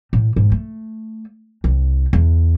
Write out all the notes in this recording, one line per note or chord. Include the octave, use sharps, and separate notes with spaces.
A2
G#2
A3
C2
E2